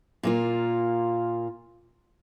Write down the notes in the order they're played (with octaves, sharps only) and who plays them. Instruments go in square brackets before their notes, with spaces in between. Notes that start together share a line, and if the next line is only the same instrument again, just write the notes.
[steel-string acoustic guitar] A#2 A#3 F4